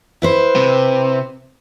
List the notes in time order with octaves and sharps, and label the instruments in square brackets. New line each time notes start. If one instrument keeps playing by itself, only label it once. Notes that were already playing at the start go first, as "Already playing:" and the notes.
[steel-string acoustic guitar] E4 B4 C5
[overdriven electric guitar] C3